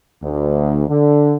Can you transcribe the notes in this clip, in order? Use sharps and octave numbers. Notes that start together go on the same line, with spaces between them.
D2
D3